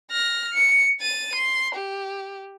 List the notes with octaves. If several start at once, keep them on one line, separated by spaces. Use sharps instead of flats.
F6 A#6
C#7
A6 D#7
C6
G4